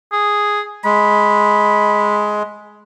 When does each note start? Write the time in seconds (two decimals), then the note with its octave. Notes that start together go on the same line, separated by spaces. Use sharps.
0.12 G#4
0.84 G#3 B5